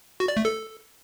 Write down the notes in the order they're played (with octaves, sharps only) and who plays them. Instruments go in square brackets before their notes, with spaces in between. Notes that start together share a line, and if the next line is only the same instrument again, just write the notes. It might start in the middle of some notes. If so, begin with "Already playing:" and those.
[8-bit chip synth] F#4
D5
A3
A4